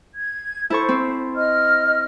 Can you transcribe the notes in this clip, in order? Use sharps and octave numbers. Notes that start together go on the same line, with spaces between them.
G#6
E4 A4 C5 C#6
C4
D#5 F6